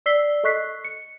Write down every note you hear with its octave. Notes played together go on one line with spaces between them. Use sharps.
D5 E6 B6 C7 G7
A4 D#5 C#6 F#6 B6 C7
C#7